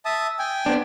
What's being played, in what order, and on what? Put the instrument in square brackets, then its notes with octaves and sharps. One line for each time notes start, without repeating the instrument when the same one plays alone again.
[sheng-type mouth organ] E5 A5 D#6
G5 G#5
[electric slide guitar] B3 C4 D4